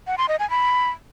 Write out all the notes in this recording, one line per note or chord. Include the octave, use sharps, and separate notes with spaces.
F#5
C6
D#5
G#5
B5